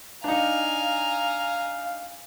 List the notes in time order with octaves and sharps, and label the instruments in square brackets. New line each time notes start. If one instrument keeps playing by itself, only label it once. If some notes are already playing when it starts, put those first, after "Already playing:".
[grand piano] D4 D#4 [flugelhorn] F5 [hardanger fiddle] G#5 A#5